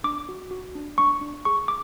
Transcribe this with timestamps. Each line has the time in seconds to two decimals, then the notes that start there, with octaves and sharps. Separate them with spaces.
0.04 D4 D6
0.29 F#4
0.51 F#4
0.75 D4
0.98 D4 C#6
1.21 D4
1.45 G#4 C#6
1.68 D6